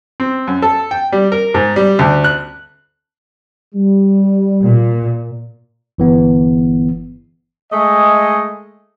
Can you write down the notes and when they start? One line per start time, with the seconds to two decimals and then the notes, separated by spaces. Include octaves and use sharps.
0.20 C4
0.47 F#2
0.62 A4
0.91 G5
1.12 G3
1.32 A#4
1.54 G#2
1.76 G3
1.99 D2
2.24 F#6
3.75 G3
4.63 A#2
5.98 G1 E3 B3
7.71 G#3 A3 D#5